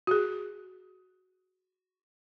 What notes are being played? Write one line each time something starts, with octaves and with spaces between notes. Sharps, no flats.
F#4 G#4